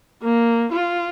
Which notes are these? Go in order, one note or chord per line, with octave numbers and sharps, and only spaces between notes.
A#3
F4